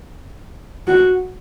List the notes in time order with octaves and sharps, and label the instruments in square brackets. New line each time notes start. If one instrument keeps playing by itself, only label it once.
[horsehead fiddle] F#4